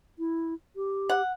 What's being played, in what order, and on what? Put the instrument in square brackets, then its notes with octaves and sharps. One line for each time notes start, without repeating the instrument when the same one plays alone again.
[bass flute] E4
G4
[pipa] F#5